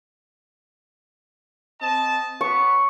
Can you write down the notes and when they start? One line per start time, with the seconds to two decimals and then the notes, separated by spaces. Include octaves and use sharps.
1.80 C4 D#5 A5
2.41 B3 C#6